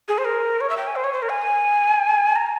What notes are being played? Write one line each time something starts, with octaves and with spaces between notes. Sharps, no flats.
G#4
C5
A#4
C#5
E5
G5
G#5
C5
C#5
C5
A#4
G#5
A#5